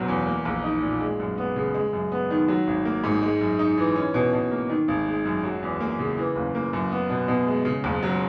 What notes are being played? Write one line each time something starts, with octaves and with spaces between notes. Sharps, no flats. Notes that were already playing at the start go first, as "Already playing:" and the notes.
Already playing: F#1 B2 F#3
E2
A#3
A#1
D#4
A#2
G#3
F#2
B3
C#3
G#3
F#2
B3
D#3
F#3
G#1
A#3
G#2
G#3
F#2
D#4
E3
C#4
B2
B2
A#3
D#3
G#1
G#3
F#2
F#3
E2
A#3
C#3
E3
F#1
A#3
F#2
B3
B2
B2
G#3
C#3
F#1
F#3